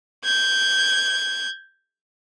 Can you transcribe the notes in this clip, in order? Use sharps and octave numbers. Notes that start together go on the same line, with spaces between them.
G6 G#6